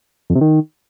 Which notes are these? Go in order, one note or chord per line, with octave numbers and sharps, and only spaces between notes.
F2
C3
D#3